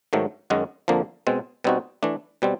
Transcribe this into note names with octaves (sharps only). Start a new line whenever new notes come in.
G#2 D#3 F#3 A3
F#2 D#3 G#3 C#4 F#4
F2 D3 F3 A#3
B2 G#3 C4
B2 G3 C4 D#4 F#4
E3 A3 D4
B2 G3 C4